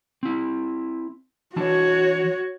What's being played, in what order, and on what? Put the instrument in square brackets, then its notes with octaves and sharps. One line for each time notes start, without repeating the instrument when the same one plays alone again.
[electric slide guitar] C4 E4
[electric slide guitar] E3 D4 A5 [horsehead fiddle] F#4 C#5